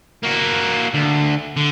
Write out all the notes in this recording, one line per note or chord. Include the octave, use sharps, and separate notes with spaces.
A#3 F#4
D2
D3